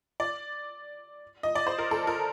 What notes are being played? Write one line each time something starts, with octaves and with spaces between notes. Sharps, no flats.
D5
D#5
D5
C5
A#4
A4
A#4